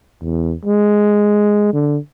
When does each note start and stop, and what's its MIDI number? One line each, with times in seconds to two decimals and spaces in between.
0.22 0.54 40
0.65 1.72 56
1.73 1.97 50